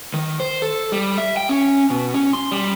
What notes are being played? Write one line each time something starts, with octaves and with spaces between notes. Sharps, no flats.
D#3
C5
A4
G3
E5
G5
C#4
B2
C#4
C6
G3